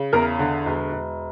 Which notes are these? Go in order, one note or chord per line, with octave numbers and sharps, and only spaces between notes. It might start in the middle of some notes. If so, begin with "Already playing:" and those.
Already playing: C#3
E2 A#4
D3
E1
E1